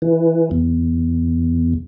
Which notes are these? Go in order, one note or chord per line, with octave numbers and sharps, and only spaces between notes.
E3
E2